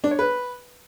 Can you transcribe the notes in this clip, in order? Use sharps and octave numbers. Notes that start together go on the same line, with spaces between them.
D4
C#5
B4